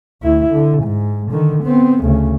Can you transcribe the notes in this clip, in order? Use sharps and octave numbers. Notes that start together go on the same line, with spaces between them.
D2 E4
D3
G#2
D3 D#3
B3 C4
D2 C#3